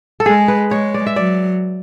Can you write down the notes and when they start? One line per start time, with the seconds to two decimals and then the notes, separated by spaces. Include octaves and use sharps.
0.20 A4
0.26 G#3 G#4
0.48 B4
0.71 G#3 C#5
0.94 D5
1.06 E5
1.16 F#3 D5